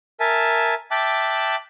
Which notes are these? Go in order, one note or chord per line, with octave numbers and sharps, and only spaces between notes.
A#4 E5 G#5 A5
E5 G5 A5 D6 F#6